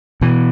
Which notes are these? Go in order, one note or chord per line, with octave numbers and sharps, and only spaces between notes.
B2 E3